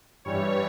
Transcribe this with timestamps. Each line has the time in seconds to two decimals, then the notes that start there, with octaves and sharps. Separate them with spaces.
0.25 G2 E3 G3 C#5